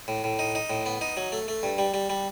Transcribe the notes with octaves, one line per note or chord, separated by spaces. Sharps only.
A2
A2
D#4
D#4
A2
B3
D#4
F#3
A3
A3
G2
G3
G3
G3